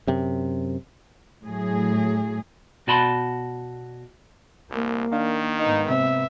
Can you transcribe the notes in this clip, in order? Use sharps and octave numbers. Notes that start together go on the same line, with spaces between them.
F#2 C3
A2 F#3 G#4
B2 F#4 D5 A5 B5 C6
C2 A#3
D#3 D4 F5
G#2 B3 D#4
C3 C4 E5